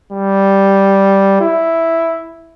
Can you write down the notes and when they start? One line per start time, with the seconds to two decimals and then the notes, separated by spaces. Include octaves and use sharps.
0.13 G3
1.41 E4